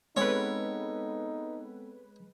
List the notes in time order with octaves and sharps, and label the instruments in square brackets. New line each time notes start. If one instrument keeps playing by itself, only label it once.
[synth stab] G#3 B4 [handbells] B3 C4 A4 [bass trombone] D#4 [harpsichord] C#5